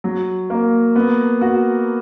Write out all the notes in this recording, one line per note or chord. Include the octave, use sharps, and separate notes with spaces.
F#3
A#3
B3
F#4